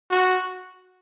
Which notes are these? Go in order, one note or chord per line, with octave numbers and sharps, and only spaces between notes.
F#4